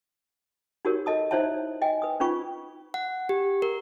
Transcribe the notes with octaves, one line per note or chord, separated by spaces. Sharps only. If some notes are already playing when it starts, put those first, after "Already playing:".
D#4 F#4 G4 A#4 C#5
A4 D#5 A5 D#6
D#4 E4 C5 C#5 E5 A5
D#5 G5 G#5
B4 D#6
C#4 D#4 F4 B4 G5 C#6
F#5
G4
A#4